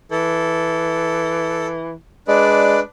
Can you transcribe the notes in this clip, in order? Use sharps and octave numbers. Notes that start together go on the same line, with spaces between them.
E3 A4
G#3 D4 B4 D5